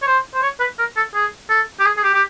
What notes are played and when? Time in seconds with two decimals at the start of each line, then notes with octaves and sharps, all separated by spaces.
0.02 C#5
0.07 C5
0.34 C5
0.42 C#5
0.60 B4
0.79 A#4
0.97 A4
1.15 G#4
1.50 A4
1.80 G4
1.86 G#4
1.97 G#4
2.04 G4
2.14 G4